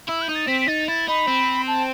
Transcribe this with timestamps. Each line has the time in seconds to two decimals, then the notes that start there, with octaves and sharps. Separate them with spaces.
0.09 E4 E6
0.22 G6
0.29 D#4
0.35 A6
0.48 C4 B6
0.61 B6
0.68 D#4 A6
0.88 E4 A6
1.08 D#4 B5
1.28 C4
1.67 A5